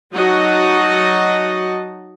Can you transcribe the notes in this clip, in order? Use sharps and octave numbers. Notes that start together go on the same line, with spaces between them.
F#3 D#4 F#4 D#5 F#5 A5